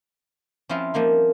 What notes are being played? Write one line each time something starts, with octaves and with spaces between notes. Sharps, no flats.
F3 C4 C#4 E4 F4
F3 G3 A#3 D#4